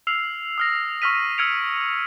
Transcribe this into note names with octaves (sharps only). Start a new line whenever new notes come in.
E6 F6 C7 F7
D#6 F6 A#6
C#6 E6 F6 B6 D#7
E6 F6 G#6 C#7 D7 F7